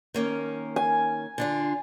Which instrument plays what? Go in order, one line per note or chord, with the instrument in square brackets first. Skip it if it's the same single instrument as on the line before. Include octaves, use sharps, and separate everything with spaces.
[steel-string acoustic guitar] D#3 A#3 C#4
[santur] G#5
[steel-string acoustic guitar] D3 D4 F4